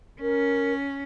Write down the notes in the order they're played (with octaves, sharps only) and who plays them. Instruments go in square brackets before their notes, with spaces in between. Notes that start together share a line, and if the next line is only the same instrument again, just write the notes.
[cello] C#4 [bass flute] A#4